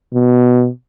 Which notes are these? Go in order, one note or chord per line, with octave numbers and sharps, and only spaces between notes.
B2